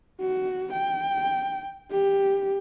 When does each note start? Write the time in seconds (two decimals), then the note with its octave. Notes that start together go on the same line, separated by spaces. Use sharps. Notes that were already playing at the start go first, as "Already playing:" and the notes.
0.21 F#4
0.73 G5
1.91 G4